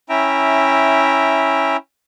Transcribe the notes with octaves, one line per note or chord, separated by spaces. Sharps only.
C#4 E4 E5 G5 A#5